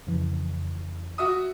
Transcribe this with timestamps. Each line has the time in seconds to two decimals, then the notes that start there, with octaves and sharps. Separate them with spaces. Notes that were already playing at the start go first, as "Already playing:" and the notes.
0.07 F2 C#3 E3
1.18 F#4 E5 D#6